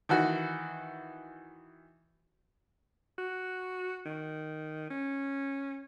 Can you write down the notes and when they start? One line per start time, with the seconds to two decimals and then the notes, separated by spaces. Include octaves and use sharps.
0.09 D#3 E3 F#4
3.18 F#4
4.05 D#3
4.90 C#4